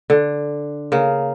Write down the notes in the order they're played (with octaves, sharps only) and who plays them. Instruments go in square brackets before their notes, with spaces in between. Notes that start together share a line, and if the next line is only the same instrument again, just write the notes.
[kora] D3
C#3 A#3